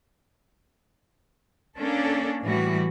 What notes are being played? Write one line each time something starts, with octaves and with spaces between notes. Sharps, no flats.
A#3 C#4 D4 A4
A2 E3 G3 F#4